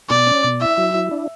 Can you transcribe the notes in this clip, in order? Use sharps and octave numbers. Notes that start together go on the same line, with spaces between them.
B2 D5
C#4
B2
E4 E5
F#3
E4
D4